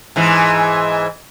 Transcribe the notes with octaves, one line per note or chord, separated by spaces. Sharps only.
G#2 E3